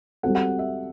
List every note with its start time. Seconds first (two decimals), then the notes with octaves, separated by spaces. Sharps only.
0.23 G3 C4 F#4 A4 F#5
0.35 F#5
0.59 E5